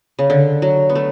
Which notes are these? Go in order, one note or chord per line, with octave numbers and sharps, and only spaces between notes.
C#3
D3
F#3
B3
A3